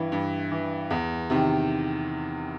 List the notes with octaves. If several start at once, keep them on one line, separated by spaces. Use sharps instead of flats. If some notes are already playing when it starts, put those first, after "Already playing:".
Already playing: G2 E3
G2
E3
E2
C3 D#3